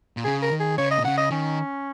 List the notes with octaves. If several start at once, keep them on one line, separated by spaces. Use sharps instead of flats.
A#2
C#3 G#4
A#4
D#3
G#4
C#3 C#5
D#5
A#2
C#3 F#5
D#5
D#3 C#4